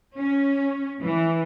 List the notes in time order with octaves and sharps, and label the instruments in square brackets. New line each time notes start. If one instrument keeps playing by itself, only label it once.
[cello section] C#4
E3